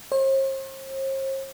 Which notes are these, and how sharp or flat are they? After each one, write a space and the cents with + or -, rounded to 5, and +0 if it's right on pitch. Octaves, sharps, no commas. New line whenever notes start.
C5 +45